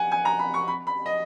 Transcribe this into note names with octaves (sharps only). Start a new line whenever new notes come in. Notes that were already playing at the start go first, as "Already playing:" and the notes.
Already playing: F#5 G#5
G#5
A#5
B5
C#6
B5
B5
D#5